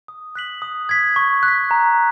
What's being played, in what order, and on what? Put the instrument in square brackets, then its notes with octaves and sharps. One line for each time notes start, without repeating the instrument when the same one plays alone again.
[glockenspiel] D#6
F#6 B6 F#7
D#6
G#6 B6
C#6
F#6
B6
A#5